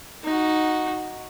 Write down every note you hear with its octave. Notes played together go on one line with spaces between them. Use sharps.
D#4 F#4